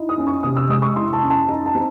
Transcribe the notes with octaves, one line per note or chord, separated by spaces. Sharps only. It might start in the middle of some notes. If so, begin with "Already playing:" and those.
Already playing: D#4 E4
D#6
C#4
C#6
C3 D#6
E6
G#3 D#6
C#6
E4 C6
A5
C#4
A5
D#4 A#5
A5
C4